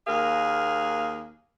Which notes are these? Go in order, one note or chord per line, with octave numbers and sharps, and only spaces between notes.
D#2 A#3 G#4 A#4 F5